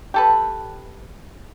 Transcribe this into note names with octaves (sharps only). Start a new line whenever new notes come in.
G4 A4 B4